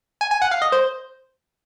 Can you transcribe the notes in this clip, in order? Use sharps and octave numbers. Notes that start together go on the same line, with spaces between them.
G#5
G#5
F#5
F5
D#5
C5